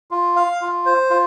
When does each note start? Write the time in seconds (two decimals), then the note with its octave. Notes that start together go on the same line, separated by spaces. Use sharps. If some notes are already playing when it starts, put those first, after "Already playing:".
0.11 F4
0.36 F5
0.61 F4
0.86 C5
1.10 F4